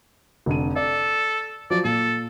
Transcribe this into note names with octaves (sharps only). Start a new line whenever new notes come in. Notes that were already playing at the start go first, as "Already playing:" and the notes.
F1 D3 D#7
A4 D5
F3 F#3 D5
A#2 A4